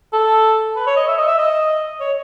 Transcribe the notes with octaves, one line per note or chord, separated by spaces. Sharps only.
A4
B4
C#5
D#5
E5
D#5
E5
D#5
C#5